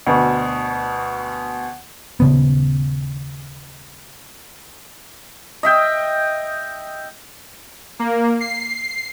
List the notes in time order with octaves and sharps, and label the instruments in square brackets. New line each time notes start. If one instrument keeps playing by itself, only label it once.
[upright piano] D2 B2
[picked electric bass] D#1 C#3 B3
[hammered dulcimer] D#5 E5 G5
[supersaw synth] A#3
C7